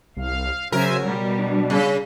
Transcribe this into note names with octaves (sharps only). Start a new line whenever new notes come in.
C2 F5
C#3 F#3 A#4 C5 E5 G#5
B2 G3
D4
C#3